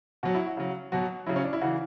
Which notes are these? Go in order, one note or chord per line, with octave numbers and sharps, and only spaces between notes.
B2 F#3 F#4
E4
F#4
C#3 F#3
B2 F#3 F#4
C#3 F#3 E4
C#4
D4
E4
C#3 E3 F#4